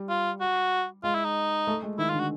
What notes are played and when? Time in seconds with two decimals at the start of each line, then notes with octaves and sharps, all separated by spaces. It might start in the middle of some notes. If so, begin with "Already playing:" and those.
Already playing: G3
0.09 F4
0.41 F#4
1.04 G#3 F4
1.14 E4
1.25 D#4
1.67 A3
1.82 G#3
1.98 D#3 E4
2.10 F4
2.14 D3
2.20 F#4